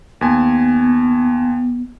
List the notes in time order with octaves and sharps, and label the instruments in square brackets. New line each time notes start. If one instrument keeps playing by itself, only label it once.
[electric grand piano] D#2 G#5 [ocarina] B3